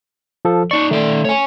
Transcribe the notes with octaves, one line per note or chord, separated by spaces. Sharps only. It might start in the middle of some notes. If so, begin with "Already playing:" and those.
F3 A4
D#4 D5 C#6
D#3 A3 D5
C#5 G#5